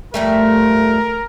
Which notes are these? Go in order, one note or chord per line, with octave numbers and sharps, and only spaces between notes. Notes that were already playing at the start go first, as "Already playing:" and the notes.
F2 G3 A3 A#4